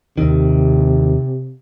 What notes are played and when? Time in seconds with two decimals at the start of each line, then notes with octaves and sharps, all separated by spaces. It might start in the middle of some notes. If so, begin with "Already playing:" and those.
0.18 D#2 C3 D#3